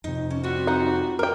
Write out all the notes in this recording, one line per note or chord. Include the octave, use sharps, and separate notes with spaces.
F2 C3 D#4
D2 C#4 A5
G3 C4 F4 F#4
D#4 F#5
G3 A#4 G5